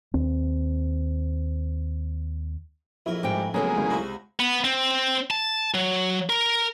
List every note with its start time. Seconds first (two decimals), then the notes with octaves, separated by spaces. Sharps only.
0.14 D#2 C4
3.06 A#1 F2 E4 A#4
3.23 G#2 G3 D#4 G5
3.54 C#3 F#3 G#3 A#3 B3 E4 G#4 A4
3.77 G#1 C#3 G3
3.90 C#2 C3 F#4
4.40 B3
4.64 C4
5.31 A5
5.74 F#3
6.30 A#4